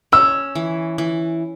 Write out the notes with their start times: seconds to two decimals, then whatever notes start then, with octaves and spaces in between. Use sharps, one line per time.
0.12 C#4 E6
0.55 E3
0.98 E3